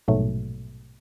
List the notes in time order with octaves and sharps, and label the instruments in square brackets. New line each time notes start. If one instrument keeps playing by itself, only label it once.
[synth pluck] A#1 G#2 B2 F#3 A3